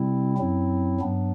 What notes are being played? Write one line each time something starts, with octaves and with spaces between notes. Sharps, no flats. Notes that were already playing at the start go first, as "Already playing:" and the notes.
Already playing: C3 G3 C4 E4
F#2 F#3 C4 E4
G2 F#3 B3 D4